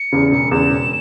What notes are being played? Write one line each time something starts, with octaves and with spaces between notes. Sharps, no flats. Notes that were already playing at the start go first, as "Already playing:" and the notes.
Already playing: C#7
E2 C#3
E1 C#7
E2 C#3 E7
E1